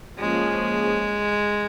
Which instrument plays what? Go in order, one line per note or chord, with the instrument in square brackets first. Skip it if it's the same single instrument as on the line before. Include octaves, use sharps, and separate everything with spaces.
[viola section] F3 A#3 C#4 G#4 [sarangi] G#3